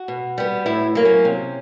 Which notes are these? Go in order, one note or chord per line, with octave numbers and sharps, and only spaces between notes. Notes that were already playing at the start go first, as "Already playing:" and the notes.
Already playing: F#4
B2
G3 B3
A2 E4
F#3 A#3
C#4
C3